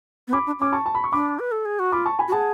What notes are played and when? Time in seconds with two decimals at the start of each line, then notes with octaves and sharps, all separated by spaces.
0.28 B3
0.33 C#4 B5 D6
0.46 D4
0.59 C#4 D6
0.72 A5 C#6
0.86 A5
0.95 B5
1.04 C#6
1.12 D4 B5 D6
1.39 B4
1.52 A4
1.65 G#4
1.79 F#4
1.92 F4 B5 D6
2.06 A5 C#6
2.19 G#5 B5
2.28 F#4
2.32 G#4 F#5 A5